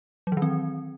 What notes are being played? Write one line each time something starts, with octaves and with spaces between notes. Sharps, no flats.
F#3
E3
D#3
C4